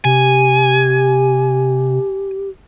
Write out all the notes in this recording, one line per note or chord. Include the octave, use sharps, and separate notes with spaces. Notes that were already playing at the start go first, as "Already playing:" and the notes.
C3 G4 G#5